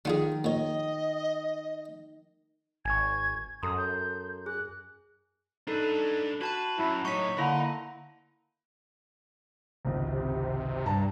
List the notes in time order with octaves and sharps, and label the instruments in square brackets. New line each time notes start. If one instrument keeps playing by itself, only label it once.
[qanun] D#3 [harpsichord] D4 F4 G#4
[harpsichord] A#2 C#5 [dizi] D#5
[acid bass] G#1 [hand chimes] G#5 C#6 [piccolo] G#6
[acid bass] F#2 [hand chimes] A4 A#5 C6 [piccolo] D#6
[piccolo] G6
[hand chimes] G#4 [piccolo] F#6
[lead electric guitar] D4 B4 [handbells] D#4 A4
[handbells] F#4 A5 F#6 [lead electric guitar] B4
[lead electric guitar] F#2 [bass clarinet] E4
[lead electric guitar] A2 D#4 [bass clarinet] F#3 [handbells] C#6 B6
[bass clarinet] D3 [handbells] A#3 E4 B5 [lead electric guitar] D#5 A#5
[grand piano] G#1 C#2 [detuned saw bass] C3
[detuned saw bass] G2 [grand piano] A5 A#5